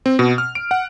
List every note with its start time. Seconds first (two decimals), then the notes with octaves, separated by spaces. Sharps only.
0.06 C4
0.19 B2
0.38 F6
0.55 D7
0.71 F#5